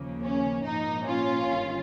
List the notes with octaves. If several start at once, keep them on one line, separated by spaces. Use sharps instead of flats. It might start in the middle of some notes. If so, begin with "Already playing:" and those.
Already playing: D#2 C#3 F3 A#3
C#4
A#1 G#2 F3 A#3 D#4
C#4 F4
G1 G2 D#3